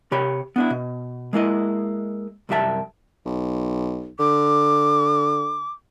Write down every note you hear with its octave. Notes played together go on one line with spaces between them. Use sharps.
C3 G4 C#5 B5
B3 D4 E4
B2
G#3 A#3 E4 D#5
C2 F#2 G4 E5 A5
B1
D3 D6